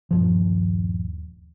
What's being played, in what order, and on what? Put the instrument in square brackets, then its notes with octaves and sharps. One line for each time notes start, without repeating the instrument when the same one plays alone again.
[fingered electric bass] D#1 G2 F3